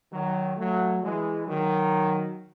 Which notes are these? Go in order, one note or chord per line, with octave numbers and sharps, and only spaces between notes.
D#3 F#3
F#3 A3
E3 G#3
D#3 F#3